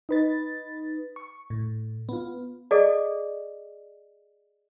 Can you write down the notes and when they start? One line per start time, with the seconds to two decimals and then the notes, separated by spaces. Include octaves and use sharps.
0.09 D#4 B4 A6
1.16 C#6
1.50 A2
2.09 B3 F4
2.71 G#4 A4 D5 D#5